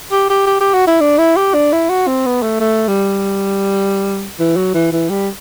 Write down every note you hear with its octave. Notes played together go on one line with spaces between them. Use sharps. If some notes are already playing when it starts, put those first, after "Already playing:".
G4
G4
G4
G4
F#4
E4
D4
E4
G4
D4
E4
F#4
C4
B3
A3
A3
G3
E3
F#3
E3
E3
G3